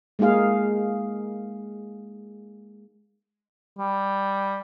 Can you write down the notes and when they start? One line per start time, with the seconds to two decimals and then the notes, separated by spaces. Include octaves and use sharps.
0.19 G#3 A#3 D#4 G#4 F5
3.78 G3